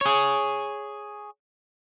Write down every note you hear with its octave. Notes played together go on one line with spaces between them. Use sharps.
G#4 C#5